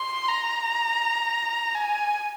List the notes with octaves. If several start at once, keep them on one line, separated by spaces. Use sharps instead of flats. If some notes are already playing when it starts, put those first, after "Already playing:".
Already playing: C6
A#5
G#5